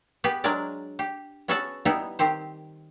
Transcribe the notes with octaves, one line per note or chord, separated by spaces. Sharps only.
B3 G4 G#4 B4
F#3 G#3 D4 A#4 D5
G4
B3 C#4 F#4 G#4 A4 F#5
G3 B3 D#4 E4
D#3 C4 G4 C5